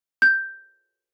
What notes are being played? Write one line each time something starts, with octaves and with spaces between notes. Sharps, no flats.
G6